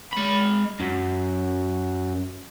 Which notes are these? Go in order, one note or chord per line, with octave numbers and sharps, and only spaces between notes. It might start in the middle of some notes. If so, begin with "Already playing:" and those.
G#3 B5
F#2